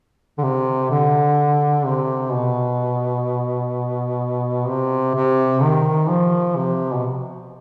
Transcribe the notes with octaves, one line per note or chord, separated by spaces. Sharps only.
D3
C3
D3
C3
B2
C3
C3
D#3
F3
C3
B2